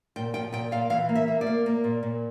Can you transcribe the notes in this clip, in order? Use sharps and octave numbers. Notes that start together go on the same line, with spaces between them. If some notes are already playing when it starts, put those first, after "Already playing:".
A#2 G5
F3 G5
A#2 G5
A#2 F5
E3 F5
A#3
E5
A#3
D5
A#3
A#3
A#2
A#2